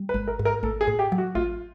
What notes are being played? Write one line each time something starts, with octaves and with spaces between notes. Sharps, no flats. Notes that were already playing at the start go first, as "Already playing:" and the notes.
Already playing: G3
B4
G#1
A#4
G#2
A#4
A1 A4
G#4
A2
G4
F#3
F#4
A1 F4